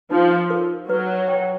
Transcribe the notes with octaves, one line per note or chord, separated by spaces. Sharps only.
F3 D#4
A#4
F#3 B4
G5